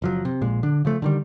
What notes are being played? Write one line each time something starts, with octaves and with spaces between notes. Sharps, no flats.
F#1 F3 F#3
C3
A#1 A#2 G#3
D3 D4
C#3 F3 A3
D3 D#3 G3